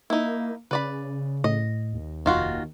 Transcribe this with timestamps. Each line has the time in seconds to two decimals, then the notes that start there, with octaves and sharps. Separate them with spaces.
0.10 A#3 D#4 E4
0.71 C#3 B4 D5 B5
1.44 A2 D#5
1.93 D#2
2.26 F1 D#3 F4 F#4